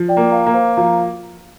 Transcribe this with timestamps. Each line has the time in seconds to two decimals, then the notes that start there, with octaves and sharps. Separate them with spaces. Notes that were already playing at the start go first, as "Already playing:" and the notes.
Already playing: F3
0.08 D5 G5
0.17 A#3
0.31 F5 A#5
0.46 A#3
0.54 C5 F5
0.77 F3 F5 A#5